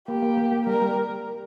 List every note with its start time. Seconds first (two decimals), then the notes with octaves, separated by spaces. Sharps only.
0.08 A#3 G4
0.22 A#3
0.38 A#3
0.52 A#3
0.67 G3 A#4
0.82 G3